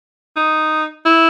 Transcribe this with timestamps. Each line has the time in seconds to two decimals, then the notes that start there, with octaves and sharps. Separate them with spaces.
0.36 D#4
1.05 E4